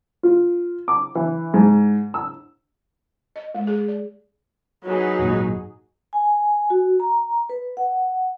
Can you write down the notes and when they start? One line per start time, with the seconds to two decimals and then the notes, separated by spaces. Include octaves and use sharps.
0.23 F4
0.88 D6
1.15 E3
1.54 G#2
2.14 E6
3.36 D#5
3.55 G#3
3.67 G#4
3.88 D5
4.86 F#3 D#4 G#4 B4
5.19 G#1 F#2 A#2
6.13 G#5
6.70 F#4
7.00 A#5
7.49 B4
7.77 F#5